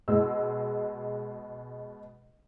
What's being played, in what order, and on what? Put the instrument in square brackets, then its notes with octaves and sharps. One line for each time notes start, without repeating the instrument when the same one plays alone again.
[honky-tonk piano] B2 G#3 E6